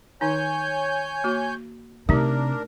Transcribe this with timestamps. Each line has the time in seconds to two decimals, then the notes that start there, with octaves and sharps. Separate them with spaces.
0.21 D#3 D#4 C#5 G#5 G6
1.24 A#3 F#4
2.09 C3 A3 D4 D#4 G4 A#4